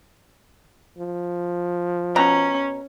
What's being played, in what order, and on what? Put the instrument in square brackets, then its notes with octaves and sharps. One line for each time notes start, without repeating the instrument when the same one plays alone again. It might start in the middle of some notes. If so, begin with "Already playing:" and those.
[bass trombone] F3
[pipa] B2 A#5 [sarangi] C#4